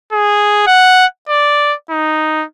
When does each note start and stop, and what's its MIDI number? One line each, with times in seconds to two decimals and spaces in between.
0.12 0.65 68
0.67 1.06 78
1.29 1.74 74
1.90 2.44 63